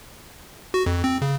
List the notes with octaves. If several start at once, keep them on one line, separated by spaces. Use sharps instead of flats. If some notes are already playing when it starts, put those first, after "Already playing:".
F#4
F2
C4
C#3